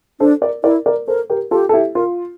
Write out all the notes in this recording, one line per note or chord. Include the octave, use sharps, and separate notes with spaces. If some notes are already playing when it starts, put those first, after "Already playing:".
D4 A4 C5
A#4 D5
E4 A#4 D5
A#4 D5
A4 A#4 C5
G4 A#4
F4 G4 A4
A4
E4 G4
F4 A#4